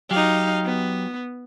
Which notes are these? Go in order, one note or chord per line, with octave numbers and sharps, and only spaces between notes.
F#3 D#4 G4 F5
B3